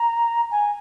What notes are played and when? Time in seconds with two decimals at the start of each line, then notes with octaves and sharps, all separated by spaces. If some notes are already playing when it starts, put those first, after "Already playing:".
Already playing: A#5
0.51 G#5